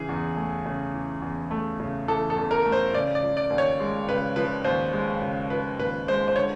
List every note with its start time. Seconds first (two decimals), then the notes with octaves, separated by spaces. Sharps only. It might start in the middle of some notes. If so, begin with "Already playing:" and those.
Already playing: C#3 E3 G#4
0.09 E2
0.36 A3
0.65 C#3
0.94 E3
1.22 E2
1.51 A3
1.80 C#3
2.08 E3 A4
2.30 A4
2.36 E2
2.51 A#4
2.65 A3
2.72 C5
2.93 C#3 D5
3.15 D5
3.23 F3
3.37 D5
3.50 D#2
3.58 C#5
3.80 G#3
4.08 C#3 B4
4.36 F3 B4
4.64 D#2 C5
4.93 G#3
5.22 C#3
5.50 F3 B4
5.79 D#2 B4
6.08 G#3 C5
6.28 C5
6.36 D3 C#5